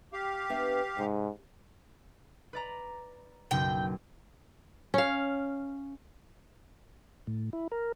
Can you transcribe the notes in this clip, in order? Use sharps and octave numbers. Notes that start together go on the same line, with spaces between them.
G4 F5
B3 D4 E5
G#2 C3
B4 D5 A#5
F#1 B1 G5
C#4 F5
A2
E4
A#4